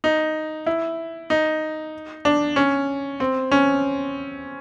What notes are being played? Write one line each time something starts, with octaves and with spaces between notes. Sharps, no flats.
D#4
E4
D#4
D4
C#4
C4
C#4